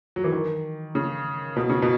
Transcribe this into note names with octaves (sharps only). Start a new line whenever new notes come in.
F#3
E3
D#3
C#3
B2
C#3
B2